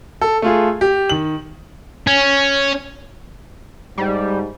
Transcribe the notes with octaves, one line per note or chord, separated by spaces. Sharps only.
A4
A3 F4 G#4
G4
D#3 F#7
C#4
G#2 G3